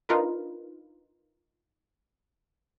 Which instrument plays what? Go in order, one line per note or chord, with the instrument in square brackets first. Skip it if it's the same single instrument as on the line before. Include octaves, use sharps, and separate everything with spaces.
[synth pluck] D4 D#4 F4 A#4 B4